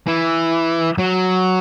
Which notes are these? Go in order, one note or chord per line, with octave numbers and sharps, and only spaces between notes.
E3
F#3